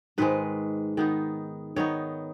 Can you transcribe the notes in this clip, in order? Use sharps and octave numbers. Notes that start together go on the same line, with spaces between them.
G#2 D#3 G#3 B4
D#3 B3 D#4
D#3 B3 D#4 C#5